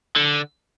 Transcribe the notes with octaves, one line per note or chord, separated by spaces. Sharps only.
D3